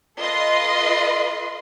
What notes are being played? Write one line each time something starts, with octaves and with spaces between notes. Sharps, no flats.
F4 A4 B4 D#5 C6